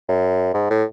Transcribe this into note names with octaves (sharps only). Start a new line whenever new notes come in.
F#2
G#2
A2